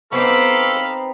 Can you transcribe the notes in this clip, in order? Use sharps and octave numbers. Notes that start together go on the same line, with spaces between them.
B3 C4 D#4 A4 C5 F5 B5 D6